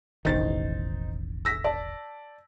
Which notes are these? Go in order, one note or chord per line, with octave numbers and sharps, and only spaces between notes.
E1 A1 D#3 D#4 C5 A6
E6 A#6 B6
D5 A5